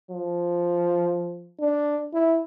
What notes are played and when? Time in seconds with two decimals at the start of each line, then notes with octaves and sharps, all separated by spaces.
0.11 F3
1.60 D4
2.13 E4